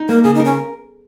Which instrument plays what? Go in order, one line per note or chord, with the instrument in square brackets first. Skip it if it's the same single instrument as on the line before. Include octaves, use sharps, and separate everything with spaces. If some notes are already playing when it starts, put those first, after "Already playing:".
Already playing: [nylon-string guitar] D#4
[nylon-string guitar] A#3 [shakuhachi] A#4
[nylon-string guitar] C#3 [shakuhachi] G#4
[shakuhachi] D#4
[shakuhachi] C#4 [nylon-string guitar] A#4